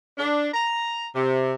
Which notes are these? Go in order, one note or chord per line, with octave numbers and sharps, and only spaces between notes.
D4
A#5
C3